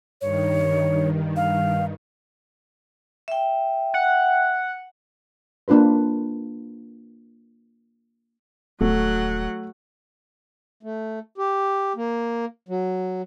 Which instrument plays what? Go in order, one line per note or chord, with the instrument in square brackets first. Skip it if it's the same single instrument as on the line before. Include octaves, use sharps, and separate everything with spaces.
[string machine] G2 D#3 [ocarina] C#5
[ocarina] F5
[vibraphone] E5 G5
[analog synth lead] F#5
[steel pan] A#3 D4 F4 B4 C5
[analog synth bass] D#1 [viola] F#3 F#5 [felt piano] A3
[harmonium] A3
G4
A#3
F#3